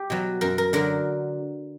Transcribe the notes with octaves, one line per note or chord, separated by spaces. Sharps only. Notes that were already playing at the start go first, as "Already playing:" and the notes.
Already playing: G4
B2 F#3
F#2 A#4
A#4
D3 F#3 A#4